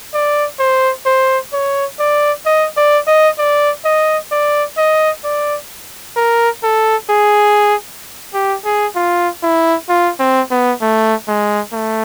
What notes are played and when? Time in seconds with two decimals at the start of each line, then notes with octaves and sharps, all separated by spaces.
0.14 D5
0.59 C5
1.06 C5
1.53 C#5
1.99 D5
2.46 D#5
2.77 D5
3.07 D#5
3.38 D5
3.85 D#5
4.32 D5
4.78 D#5
5.24 D5
6.17 A#4
6.64 A4
7.10 G#4
8.34 G4
8.65 G#4
8.96 F4
9.43 E4
9.89 F4
10.20 C4
10.51 B3
10.82 A3
11.28 G#3
11.74 A3